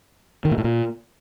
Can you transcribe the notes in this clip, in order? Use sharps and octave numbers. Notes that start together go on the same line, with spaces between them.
D#3
A#2
A2
A#2